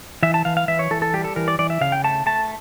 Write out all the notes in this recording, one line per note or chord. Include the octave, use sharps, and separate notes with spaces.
E3 E5
A5
E3 F5
F5
E3 E5
C#5
E3 A4
A4
G3 G4
A4
E3 A#4
D5
E3 D5
E5
C#3 F5
G5
A3 A5
A3 A5